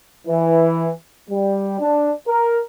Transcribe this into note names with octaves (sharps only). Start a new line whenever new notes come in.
E3
G3
D4
A#4